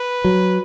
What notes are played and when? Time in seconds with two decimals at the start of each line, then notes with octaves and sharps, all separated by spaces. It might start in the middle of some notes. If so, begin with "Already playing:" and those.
Already playing: B4
0.24 F#3